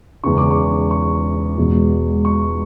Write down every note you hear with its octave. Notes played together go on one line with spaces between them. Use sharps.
E1 E2 C#3 C#6
D6
C#6
C#6
E1 E2 B2 G#3
C#6